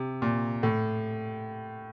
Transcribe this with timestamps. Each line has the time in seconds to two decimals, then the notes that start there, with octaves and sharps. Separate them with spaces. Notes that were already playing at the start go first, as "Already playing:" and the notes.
Already playing: C3
0.22 A#2
0.63 A2